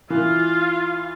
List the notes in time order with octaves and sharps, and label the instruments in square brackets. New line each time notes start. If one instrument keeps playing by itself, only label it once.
[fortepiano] E3 [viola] F4 F5